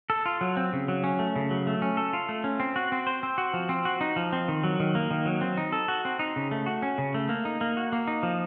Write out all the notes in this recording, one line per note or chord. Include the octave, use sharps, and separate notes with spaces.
A4
F4
F#3
C4
C#3
F#3
C#4
A3
C#3
F#3
A3
C#4
A4
F4
A3
C#4
C4
F#4
C4
C5
C4
F#4
F3
C4
F#4
D#4
F3
C4
D#3
F#3
D#3
A#3
D#3
F#3
C4
D#4
A4
F#4
C4
D#4
C#3
A3
F#4
C#4
C#3
A3
A#3
D#4
A#3
F#4
A#3
D#4
F3